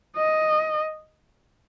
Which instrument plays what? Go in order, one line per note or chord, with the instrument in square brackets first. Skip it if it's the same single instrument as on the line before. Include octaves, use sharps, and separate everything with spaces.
[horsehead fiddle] D#5